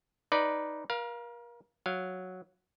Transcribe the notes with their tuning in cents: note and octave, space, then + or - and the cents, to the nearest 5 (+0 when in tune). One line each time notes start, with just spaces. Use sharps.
D#4 +0 B4 +0 D5 +0
A#4 +35 F5 +0
F#3 -5 F5 +0